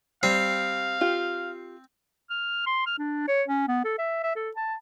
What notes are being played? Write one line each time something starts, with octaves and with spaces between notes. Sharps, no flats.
G3 C4 F5 C7
F4 G4
F6
C6
F6
D4
C#5
C#4
B3
A4
E5
E5
A4
A5